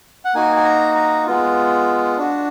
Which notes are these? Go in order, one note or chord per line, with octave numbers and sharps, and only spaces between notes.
F#5
A#3 D#4 F#4 G#5
G#5
A#5
A#5
G#3 B3 F4
D4 F#4